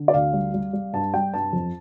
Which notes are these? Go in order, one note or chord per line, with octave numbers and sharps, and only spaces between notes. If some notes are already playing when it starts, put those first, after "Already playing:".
Already playing: D3
D5
D2 F5
G3
G3
G3
G2 A5
G3 G5
G2 A5
F2